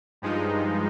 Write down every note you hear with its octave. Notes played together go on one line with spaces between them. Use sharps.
G2 F3 G#3 D#4